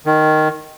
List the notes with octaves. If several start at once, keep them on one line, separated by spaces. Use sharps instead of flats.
D#3